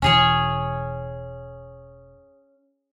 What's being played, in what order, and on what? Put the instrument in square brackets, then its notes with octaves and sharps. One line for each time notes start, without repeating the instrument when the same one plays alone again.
[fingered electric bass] E1 E3 [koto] C#4 G#4 C#5